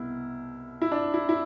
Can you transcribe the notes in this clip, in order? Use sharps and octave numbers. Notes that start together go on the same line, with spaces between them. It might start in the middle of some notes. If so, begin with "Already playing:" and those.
Already playing: C2 B2 B3 E4
E4
D4
E4
E4